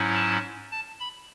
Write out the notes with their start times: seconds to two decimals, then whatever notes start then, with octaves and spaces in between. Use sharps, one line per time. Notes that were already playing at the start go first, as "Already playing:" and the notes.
Already playing: G#2 F#3 C#4 E4
0.15 A5
0.72 A5
1.00 B5